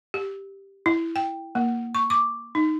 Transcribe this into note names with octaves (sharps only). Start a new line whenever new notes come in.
G4
E4
G5
A#3
C#6
D6
D#4